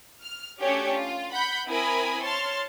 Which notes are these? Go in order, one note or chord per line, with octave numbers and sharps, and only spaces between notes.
F6
A3 C#4 D4 F#4 G4 C#5
F4
F#5 B5 G6 B6
C4 E4 A#4 G#5 B5 D#6
C#5 A5 C6 F6